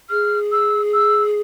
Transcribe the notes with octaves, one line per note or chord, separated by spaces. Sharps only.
G#4 F6
E6
E6